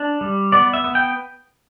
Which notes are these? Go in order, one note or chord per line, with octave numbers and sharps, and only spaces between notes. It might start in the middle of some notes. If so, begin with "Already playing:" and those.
Already playing: D4
G3
B3 D5
E5
B3
G5